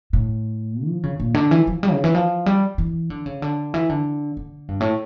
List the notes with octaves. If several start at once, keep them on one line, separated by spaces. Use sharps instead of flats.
A2
F3
C#3
A#2
D3
E3
F3
G3
C#3
E3
F3
G3
E3
D3
C#3
D3
E3
D3
D3
G2
A2